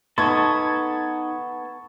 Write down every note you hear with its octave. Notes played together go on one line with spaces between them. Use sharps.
B3 D#4 A4 A5 C#6 D#6 G#6